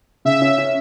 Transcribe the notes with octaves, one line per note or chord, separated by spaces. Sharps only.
C#3 E5
C#4
C#4